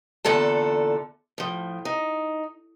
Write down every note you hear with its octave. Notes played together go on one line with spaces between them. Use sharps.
E2 A#2 D3 A4 A5
A2 F3
D#4